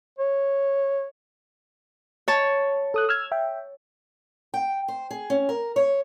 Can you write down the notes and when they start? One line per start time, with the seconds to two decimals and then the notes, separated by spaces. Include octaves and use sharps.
0.18 C#5
2.28 C#5 A5
2.94 A4 D#6 F#6
3.09 E6 F6 G#6
3.32 E5 G5
4.54 G5
4.88 C5
5.11 G#4
5.30 C#4
5.49 A#4
5.76 C#5